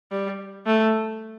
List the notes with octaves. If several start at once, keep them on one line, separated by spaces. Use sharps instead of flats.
G3
A3